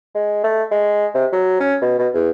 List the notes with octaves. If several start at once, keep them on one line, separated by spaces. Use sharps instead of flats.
G#3
A3
G#3
C3
F#3
C#4
B2
B2
E2